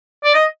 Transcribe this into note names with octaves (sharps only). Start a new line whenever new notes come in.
D5
D#5